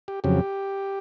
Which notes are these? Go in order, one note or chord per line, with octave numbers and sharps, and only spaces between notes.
G4
F2 C#3 F#3 G4